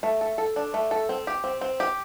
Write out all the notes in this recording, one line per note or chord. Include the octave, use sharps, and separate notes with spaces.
A3
A4
A4
D4
A3
A4
C4
G4
C4
C4
G4